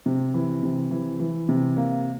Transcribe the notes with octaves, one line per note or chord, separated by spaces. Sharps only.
C3
E3
C3
E3
E3
C3
A#3